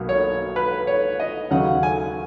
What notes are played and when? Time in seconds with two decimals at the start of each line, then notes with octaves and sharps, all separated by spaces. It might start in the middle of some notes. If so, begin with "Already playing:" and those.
Already playing: B1 B2 F#3 A#3
0.09 C#5
0.56 B4
0.87 C#5
1.20 D#5
1.50 D#2 C#3 F#3 F#5
1.83 G#5